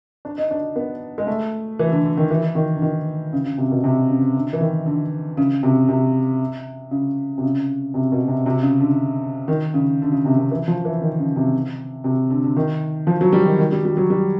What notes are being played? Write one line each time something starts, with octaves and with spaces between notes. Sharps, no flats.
D4
D#4
D4
B3
G#3
A3
E3
D3
D3
D#3
E3
D#3
D3
D#3
C#3
C#3
C3
B2
C3
C#3
D3
E3
D#3
D3
C#3
C3
C3
C#3
C3
C#3
C3
B2
C3
C3
C#3
D3
D#3
C#3
D3
C#3
C3
C3
E3
F3
E3
D#3
C#3
C3
C3
D3
D3
D#3
F3
F#3
G3
D#3
D#3
G3
G3
F#3
G3